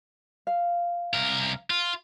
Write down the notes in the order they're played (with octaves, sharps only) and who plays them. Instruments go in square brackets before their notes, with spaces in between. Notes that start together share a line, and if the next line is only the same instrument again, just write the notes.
[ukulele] F5
[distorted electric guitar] C2 A#4
F4